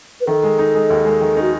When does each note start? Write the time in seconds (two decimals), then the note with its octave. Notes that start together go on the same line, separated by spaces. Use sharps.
0.21 B4
0.27 D#3 A4
0.43 G#3
0.59 D#4
0.75 G#3
0.90 D#2
1.05 G#3
1.21 D#3
1.37 D#4
1.42 F#4